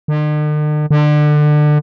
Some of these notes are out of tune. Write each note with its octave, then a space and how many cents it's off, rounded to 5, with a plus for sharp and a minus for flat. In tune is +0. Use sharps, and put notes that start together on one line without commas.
D3 +45
D3 +25